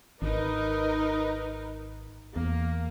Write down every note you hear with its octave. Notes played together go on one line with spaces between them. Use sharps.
G#1 D#4 A#4 B4
E2 A#3